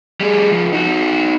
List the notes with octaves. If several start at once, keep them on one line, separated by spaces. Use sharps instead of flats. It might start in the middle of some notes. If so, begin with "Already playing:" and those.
G3 G#4
C#2 F3
D#4 F#4